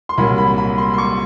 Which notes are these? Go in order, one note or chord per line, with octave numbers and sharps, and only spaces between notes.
C6
C2 A#2 F#3 A#3 B5
B5
B5
C6
C6
C#6